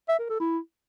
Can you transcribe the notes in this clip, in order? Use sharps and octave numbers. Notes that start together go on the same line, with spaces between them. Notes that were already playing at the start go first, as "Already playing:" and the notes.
E5
A#4
A4
E4